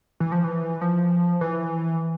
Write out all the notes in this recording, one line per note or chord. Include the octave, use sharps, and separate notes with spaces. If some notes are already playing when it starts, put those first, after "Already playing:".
E3
F3
E3
F3
E3